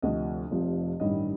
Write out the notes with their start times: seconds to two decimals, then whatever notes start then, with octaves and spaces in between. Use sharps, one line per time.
0.02 D2 C3 F3 D#5
0.51 F1 F2 C3 F3
1.00 A1 G2 D#3 G3 D4 D#5